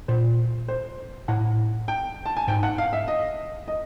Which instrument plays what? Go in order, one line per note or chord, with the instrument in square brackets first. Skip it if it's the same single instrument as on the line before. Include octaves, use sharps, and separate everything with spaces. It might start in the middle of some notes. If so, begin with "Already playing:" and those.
[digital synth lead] A#2 [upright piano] C5
[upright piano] C5
[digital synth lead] A2 [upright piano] F#5
[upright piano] G5
A5
G#5
[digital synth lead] G#2 [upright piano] G5
[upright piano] F#5
F5
E5
D#5
D#5